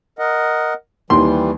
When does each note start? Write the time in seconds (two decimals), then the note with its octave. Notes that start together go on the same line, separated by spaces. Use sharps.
0.19 A#4 D#5 F#5
1.10 D#2 E3 G3 C6